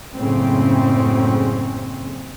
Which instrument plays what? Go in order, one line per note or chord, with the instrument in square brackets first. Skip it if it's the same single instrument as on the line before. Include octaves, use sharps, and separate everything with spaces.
[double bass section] F#1 A2 C#3 C4 C#4